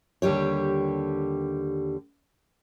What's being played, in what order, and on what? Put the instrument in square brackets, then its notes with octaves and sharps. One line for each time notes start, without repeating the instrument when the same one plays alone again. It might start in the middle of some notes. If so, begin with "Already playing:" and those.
[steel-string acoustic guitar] D#2 D3 G3 G4 C#5